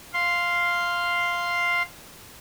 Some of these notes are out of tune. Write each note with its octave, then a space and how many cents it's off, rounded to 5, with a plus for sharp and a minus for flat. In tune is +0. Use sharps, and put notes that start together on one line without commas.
F5 +0 C6 +0